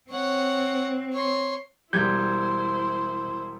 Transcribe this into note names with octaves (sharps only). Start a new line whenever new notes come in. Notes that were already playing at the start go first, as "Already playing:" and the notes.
C4 C#5 F#5
C#5 C6
E1 G3 E4 C5 G6 G#6